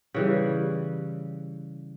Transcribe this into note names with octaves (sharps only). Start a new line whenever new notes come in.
C#3 E3 G3